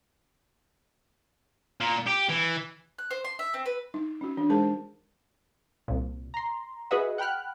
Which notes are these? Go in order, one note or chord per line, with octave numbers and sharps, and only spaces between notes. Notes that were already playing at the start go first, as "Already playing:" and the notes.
A#2
G4
E3
F#6
C5
C6
E5
C4
B4
D#4
C#4 F#4
E3 D4
G#3 D#4 G#4 A#4 C5 A5
C2 A#2
A#5 C6
F#4 G#4 B4 D#5 E5 F#5
F#5 G5 B5 F6 F#6